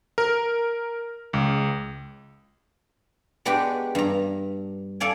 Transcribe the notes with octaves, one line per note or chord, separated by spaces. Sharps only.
A#4
C#2
G#3 B3 D4 F#4 G4
G2 A#5
A4 D5 F5 G#5